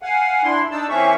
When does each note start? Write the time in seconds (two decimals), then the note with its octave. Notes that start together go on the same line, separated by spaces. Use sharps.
0.02 F5 F#5 G#5
0.43 D4 E4 C6
0.71 D4 D#4 A5 E6
0.89 E3 A#3 C4 C#4 E5 C#6